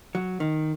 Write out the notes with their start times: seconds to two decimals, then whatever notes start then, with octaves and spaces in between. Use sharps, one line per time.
0.15 F#3
0.40 D#3